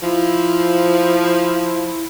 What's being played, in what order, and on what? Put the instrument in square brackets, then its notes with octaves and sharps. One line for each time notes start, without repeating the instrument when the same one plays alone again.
[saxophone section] F3 [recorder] E4